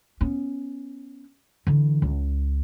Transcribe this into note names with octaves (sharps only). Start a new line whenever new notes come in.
B3 C#4
D3 E3
C#2